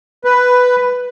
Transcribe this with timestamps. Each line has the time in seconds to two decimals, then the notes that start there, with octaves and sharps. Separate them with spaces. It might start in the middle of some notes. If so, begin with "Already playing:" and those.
0.25 B4